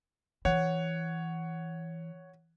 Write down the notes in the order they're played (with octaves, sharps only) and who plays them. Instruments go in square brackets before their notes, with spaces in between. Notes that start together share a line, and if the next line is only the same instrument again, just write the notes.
[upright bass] E3 [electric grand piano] C#5 F#5